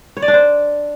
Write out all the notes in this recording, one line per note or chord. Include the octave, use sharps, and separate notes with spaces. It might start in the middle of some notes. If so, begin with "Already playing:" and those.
C#5
D5
D4
C5